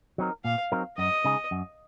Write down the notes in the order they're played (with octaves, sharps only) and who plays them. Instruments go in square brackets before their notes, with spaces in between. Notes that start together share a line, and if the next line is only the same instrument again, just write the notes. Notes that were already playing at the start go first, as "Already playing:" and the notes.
[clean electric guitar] F#3 C4 D#4 A#4
[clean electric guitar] A#2 [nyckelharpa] F5
[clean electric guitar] F#3 C4 D#4 A#4
[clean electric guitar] F#2 [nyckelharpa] D#5
[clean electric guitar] C#3 G#3 D#4 G#4
F#2